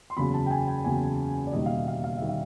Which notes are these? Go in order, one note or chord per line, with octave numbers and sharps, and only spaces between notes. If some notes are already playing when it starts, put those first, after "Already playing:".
C6
F#1 E2 C#3 F#3 B5
A5
G5
G#5
G5
F#1 E2 C#3 F#3 G#5
D5
E1 D#2 D#3 G3 D#5
F5
E5
F5
F5
D#3 G3 E5
F5